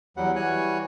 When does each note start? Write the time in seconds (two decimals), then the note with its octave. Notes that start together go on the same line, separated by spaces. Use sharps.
0.17 E2 F#3 G3 F#5
0.36 E3 G3 F#4 C#5 G#5 F#6